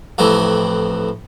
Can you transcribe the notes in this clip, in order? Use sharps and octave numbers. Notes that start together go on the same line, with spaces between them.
F2 A2 C3 E3